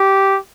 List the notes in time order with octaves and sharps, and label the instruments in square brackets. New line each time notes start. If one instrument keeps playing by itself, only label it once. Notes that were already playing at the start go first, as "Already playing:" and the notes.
Already playing: [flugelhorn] G4